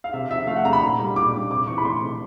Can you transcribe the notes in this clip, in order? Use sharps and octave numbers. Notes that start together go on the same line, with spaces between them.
F5
C3 E5
F3 E5
A3 F5
F#5
C3 A#5
B5
A#2
G3
A#2 D6
G3
C3 D6
E3 C#6
B5
A3 C6
C3